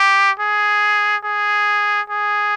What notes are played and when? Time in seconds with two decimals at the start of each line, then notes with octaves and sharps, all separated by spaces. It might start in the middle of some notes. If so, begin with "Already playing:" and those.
Already playing: G4
0.40 G#4
1.24 G#4
2.10 G#4